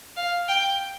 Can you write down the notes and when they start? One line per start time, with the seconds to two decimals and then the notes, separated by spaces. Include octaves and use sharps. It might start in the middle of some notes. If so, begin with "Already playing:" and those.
0.16 F5
0.48 G5